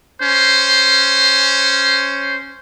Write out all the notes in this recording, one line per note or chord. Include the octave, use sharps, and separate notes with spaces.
C#4 C5